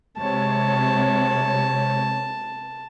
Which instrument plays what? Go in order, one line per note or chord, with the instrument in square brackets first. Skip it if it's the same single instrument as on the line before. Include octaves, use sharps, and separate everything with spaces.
[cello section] C3 G#3 C#5 [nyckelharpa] A5